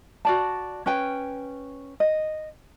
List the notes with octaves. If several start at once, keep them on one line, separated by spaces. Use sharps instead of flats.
F#4 D5 A5
C#4 B4 G5 G#5
D#5